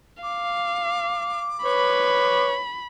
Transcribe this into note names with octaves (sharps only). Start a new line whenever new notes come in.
F5 D6
B4 C#5 B5